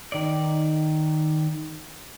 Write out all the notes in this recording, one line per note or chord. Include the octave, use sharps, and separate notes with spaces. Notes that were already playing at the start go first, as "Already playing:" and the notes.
D#3 D5